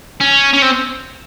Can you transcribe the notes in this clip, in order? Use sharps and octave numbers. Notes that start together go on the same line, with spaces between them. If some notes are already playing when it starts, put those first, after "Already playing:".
C#4
C#4
C4